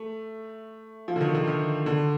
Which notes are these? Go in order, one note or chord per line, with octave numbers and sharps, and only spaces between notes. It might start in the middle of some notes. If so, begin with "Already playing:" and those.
Already playing: A3
F3
D3
D#3
D3
D#3
D3